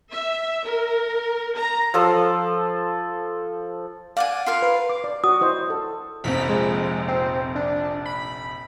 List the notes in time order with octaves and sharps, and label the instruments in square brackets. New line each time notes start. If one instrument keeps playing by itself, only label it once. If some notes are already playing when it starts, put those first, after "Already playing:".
[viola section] E5
A#4
A#5
[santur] F3 A4 C6
[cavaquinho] D5 F#5 G#5 [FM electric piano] F5
[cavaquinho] F4 A#4 F5
[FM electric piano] B4
[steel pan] D6
D5
[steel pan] F#4 [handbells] D#6
[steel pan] E4 C5 D#5
A4
[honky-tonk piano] F1 A#1 F2 [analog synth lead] B6
[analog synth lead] G#3
C4
D4
B5